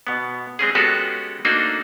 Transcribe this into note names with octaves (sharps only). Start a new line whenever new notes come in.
B2 B3
G#3 C4 C#4 G#4
G#3 B3 C#4 F#4 G4 A4
A3 A#3 D4 D#4 F#4 C5